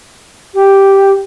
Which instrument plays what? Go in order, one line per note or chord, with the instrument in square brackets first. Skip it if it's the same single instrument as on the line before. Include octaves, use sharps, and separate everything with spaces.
[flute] G4